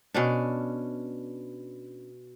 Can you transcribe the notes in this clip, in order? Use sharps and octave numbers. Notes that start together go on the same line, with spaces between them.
B2 C#4 D4